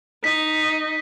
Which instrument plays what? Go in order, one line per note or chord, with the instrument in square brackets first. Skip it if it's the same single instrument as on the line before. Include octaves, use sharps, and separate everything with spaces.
[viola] D#4 [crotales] B6